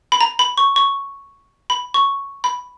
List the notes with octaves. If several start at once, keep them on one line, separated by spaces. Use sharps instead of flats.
B5
A#5
B5
C#6
C#6
B5
C#6
B5